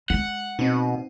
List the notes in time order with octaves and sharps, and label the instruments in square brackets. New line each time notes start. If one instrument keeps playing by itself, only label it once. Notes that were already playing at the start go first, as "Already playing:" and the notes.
[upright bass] G#3 [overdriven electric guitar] F#5
[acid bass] B2 [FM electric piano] C4 D#4